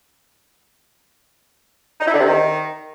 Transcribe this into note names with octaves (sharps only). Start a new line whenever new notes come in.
D#4
E4
D3
C3
D#3